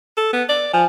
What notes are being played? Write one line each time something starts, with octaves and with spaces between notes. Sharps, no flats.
A4
B3
D5
F3 G#5